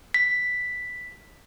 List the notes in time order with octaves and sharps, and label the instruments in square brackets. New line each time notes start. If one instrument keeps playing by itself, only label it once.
[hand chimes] B6